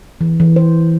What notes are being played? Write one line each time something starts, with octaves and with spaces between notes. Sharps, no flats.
E3
E3
C5